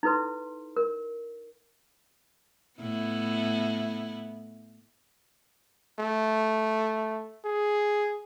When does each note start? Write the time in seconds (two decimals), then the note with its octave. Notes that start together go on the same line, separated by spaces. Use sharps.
0.03 D#4 E4 A4 B4 C6
0.77 A#4
2.79 A2 B3 E4
6.00 A3
7.45 G#4